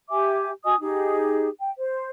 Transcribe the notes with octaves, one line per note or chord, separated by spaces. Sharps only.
G4 E5 G#5 D6
F#4 D#5 G#5 D#6
D#4 G4 G#4
G5
C5